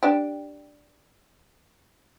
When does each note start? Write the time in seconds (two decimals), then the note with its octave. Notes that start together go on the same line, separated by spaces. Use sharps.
0.03 D4 G4